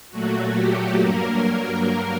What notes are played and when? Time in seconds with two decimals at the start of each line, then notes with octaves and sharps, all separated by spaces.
0.11 A#2 F#3 A3 F#4
0.56 G4
0.99 G2 F#3 A#3 A#4